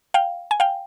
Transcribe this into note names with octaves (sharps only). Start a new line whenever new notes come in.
F5 G5
G#5
F5 G5